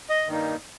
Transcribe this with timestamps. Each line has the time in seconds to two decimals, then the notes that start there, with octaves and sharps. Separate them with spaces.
0.10 D#5
0.27 G2 D#3 G3 A#3 D#4